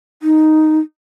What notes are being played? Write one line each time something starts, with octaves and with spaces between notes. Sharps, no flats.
D#4